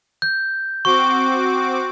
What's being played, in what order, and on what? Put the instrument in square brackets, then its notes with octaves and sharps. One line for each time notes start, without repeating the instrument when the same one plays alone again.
[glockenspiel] G6
[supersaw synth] C4 F#4 D6 [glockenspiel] C#6